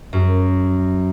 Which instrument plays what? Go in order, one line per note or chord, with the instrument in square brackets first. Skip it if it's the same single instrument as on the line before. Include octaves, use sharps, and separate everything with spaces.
[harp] F#2